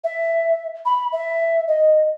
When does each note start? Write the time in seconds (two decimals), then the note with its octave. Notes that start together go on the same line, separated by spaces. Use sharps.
0.04 E5
0.85 B5
1.12 E5
1.68 D#5